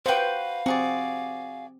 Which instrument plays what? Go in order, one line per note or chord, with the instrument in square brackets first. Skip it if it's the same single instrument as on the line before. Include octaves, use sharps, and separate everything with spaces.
[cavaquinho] F#4 B4 [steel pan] C5 G5 [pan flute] F5
[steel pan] C4 [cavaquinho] F#4 G#4 D5